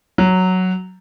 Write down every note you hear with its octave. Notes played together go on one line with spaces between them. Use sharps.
F#3